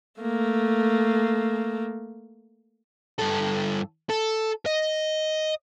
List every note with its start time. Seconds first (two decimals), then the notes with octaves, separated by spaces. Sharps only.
0.21 A3 A#3
3.19 G2 A4
4.10 A4
4.66 D#5